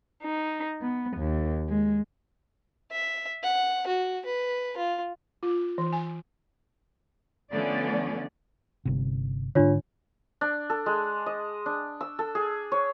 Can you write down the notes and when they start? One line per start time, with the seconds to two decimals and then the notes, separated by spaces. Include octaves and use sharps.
0.22 D#4
0.81 B3
1.17 D#2
1.68 G#3
2.91 E5
3.43 F#5
3.87 F#4
4.26 B4
4.77 F4
5.43 F4
5.78 E3
5.93 G#5
7.52 D3 F3 A3 B3 C#4 D5
8.85 G1 C3
9.55 G#2 D3 D4 F4 C#5
10.41 D4
10.70 A4
10.86 G#3
11.26 D#5
11.66 D4
12.01 E6
12.19 A4
12.35 G#4
12.72 C#5